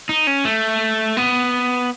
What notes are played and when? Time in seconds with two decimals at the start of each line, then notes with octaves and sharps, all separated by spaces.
0.09 D#4
0.27 C#4
0.45 A3
1.17 B3